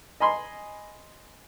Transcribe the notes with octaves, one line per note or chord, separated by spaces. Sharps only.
D#5 G#5 B5 C6